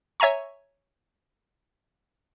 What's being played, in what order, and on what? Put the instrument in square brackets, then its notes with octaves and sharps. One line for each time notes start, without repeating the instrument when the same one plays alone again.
[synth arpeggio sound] C#5 E5 G#5 A#5 C#6